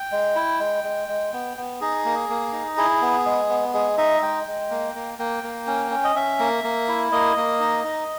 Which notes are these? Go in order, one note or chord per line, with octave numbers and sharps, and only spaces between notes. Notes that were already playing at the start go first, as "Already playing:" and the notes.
Already playing: G5
G#3
E4
G#3
G#3
G#3
B3
B3
D#4 G#4
A#3
A#3
D#4
E4 G#4
B3
G#3
B3
G#3 G#4
D#4 E5
G#3 G5
G#3
A#3
A#3
A#3 G5
A#3
C#4
C#4
D#5
C#4 E5
A#3
A#3
E4
A#3 D#5
A#3
D#4
D#4